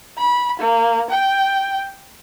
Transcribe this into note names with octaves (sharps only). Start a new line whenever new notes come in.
B5
A#3
G5